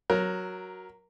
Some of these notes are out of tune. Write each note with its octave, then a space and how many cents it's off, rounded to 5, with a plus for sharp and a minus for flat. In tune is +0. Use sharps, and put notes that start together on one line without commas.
F#3 +0 A#4 +10